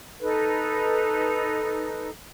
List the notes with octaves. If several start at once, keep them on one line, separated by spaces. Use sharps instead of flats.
D#4 A4 B4